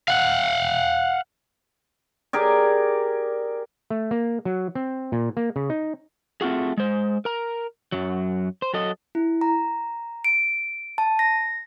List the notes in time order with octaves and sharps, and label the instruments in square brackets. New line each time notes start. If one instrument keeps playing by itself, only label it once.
[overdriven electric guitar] F5 F#5
[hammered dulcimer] G4 G#4 A#4 D5
[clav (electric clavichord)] A3
A#3
F#3
C4
A#2
A#3
C#3
D#4
[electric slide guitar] A3 C4 F4 F#4 G#4
G#3 C5
A#4 A#5
F#2 F#3
C5
F#3 A4 D#5
[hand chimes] E4
A#5
D7
A5
A#6